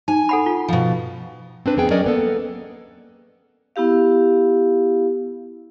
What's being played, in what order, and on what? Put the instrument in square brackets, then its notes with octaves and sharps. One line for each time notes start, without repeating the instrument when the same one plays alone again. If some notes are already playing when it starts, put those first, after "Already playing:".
[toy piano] D#4 [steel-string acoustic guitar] G#5
[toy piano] A4 F#5 B5
F4
[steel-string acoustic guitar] B2 F3
[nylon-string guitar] C4 D4 B4
F2 B3 G#4 G5
F#3 C#4 A#4 D5 D#5
A#3 B3 A4
[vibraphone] B3 E4 G4 F5